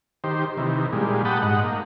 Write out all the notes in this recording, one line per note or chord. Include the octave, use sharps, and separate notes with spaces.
D#3 G4 C5
C3 D#3 E3
A#2 G3 G#3
F#5 G5 A5 B5 D#6
G#2 D#5 F#5
A#3